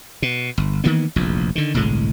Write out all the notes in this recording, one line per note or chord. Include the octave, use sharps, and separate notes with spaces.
B2
G1
D#3 E3 A#3 B3
F1 A#1 E2
D3 D#3
G1 C2 A2 G#3